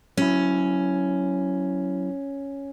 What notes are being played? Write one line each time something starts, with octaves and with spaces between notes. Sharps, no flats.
F#3 C#4 E4